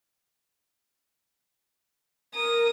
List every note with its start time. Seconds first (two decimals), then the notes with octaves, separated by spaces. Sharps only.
2.35 A#4 D#6